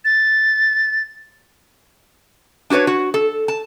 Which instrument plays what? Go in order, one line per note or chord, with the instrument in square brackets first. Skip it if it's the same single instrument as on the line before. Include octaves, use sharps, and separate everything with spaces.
[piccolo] A6
[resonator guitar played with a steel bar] D4 F#4 G#4 B4 C#5
F#4
A4
A5